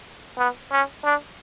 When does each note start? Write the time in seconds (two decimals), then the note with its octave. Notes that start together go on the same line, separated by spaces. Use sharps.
0.38 B3
0.71 C#4
1.04 D4